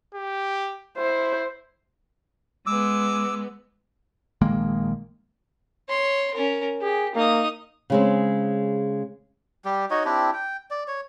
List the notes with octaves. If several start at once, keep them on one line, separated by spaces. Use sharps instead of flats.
G4
E4 C5
G#3 B3 D6 E6
A#1 D#3 G#3 A#3
C#5 C6
C#4 A#4
G4 G#4
A#3 D#4 D#6
C#3 G#3 C4
G3 G4
D#4 F#4 C#5 D#5
C4 D4 E4 G4
G5
D5
C#5